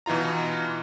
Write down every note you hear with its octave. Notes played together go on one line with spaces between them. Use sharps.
B2 E3 D#4 F4 A#5